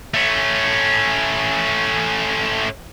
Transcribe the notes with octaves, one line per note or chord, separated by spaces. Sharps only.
A3 C#4